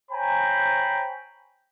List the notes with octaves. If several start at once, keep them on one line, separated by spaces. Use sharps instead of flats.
C5 C#5 G5 G#5 A#5 B5